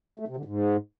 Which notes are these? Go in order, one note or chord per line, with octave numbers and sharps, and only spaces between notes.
A3
C3
D3
G#2